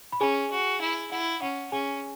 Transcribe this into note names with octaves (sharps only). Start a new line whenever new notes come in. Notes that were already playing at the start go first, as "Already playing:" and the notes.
B5
C#4 G#4 G#5
F#4
E4
E4 F#5
C#4 F#5
C#4 G#4 G#5